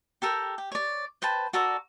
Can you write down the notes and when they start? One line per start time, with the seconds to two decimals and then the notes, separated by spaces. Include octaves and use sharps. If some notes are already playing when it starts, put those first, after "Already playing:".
0.22 G4 A4 A#4 G5
0.58 G4
0.72 C#5 D5
1.22 B4 C5 G5 A5
1.53 F#4 A4 A#4 D5